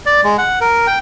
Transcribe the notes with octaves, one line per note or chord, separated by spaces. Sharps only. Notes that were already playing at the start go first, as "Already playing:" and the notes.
D5
G#3
F#5
A#4
G5